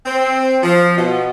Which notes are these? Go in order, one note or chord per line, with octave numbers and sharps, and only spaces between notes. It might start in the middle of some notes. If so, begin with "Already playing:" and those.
C4
F3
B2